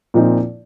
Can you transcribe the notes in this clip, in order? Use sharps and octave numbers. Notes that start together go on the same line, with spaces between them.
A#2 F3 C4 D#4